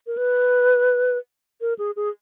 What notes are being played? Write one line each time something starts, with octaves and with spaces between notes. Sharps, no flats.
A#4
B4
A#4
G#4
G#4